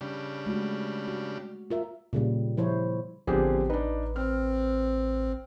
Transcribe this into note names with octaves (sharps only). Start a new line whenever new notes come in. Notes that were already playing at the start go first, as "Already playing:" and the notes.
C#3 G3 D4
G#3 A3 F#4
F#4
F4 A#4 E5
A#2 C#3 G3
F3 E4 C5 C#5
A1 D3 F3 B3 C4 G4 G#4
D4 D#4 B4
C4 F6